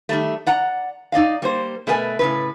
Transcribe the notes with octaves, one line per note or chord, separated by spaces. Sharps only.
D#3 G3 A3
D5 F#5 A#5
D#4 D5 D#5 F5
G3 A#3 C5
B2 A3 A#4 B4 G#5
A2 C#3 B4